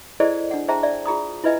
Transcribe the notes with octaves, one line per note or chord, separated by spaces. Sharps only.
E4 G#4 A4 C5 D5 D#5
D4 F#5
G#4 C5 E5 G5 A5 A#5
D5 E5
F4 G#4 A#5 D#6
E4 F4 B4 D#5 E5 G#5